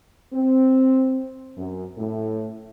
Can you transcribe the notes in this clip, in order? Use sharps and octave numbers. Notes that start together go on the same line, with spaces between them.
C4
F#2
A2